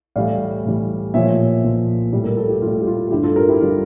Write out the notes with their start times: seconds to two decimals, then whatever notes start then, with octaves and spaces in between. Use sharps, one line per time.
0.16 A2 E3 G3 D5 F5
0.65 A2 E3 G3
1.14 A#2 F3 C#5 E5
1.64 A#2 F3
2.13 A2 G3
2.24 A#4
2.37 A4
2.49 G4
2.62 A2 G3 F4
2.81 G4
2.87 F4
3.11 G2 D3 G3 E4 G4
3.23 F4 A4
3.36 G4 A#4
3.49 E4 G4
3.61 D3 G3 F4